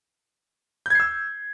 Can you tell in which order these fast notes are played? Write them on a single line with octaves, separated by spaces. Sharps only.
G6 G#6 C7 E6